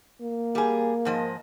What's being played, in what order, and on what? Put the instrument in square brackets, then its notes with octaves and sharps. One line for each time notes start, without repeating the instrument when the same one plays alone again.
[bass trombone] A#3
[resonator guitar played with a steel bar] G3 G#4
G#2 F3 D#5